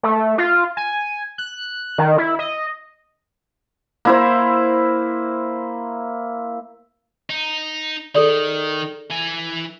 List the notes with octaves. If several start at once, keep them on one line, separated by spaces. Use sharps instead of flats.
A3
F4
G#5
F#6
D#3
E4
D#5
A#3 E4 C5
D#4
D#3 G#4 A4 D5
E3 G#5